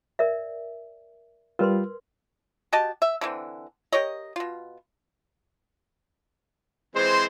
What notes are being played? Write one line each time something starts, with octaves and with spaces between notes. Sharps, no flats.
A#4 D5 E5
G3 F4 A#4 B4 C6
F#4 G4 D#5 A5
E5
D3 E3 A#3 C4
G4 A#4 C#5 D#5
B2 F4
E3 G#3 C4 C5